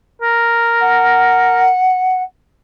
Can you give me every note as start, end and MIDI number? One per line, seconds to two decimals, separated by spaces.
0.22 1.68 70
0.80 2.22 78